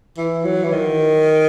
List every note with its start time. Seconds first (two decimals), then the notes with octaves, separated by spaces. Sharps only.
0.17 E3
0.45 F#3
0.64 E3
0.72 D#3